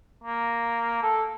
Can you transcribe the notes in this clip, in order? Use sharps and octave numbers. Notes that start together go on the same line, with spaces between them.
A#3
A4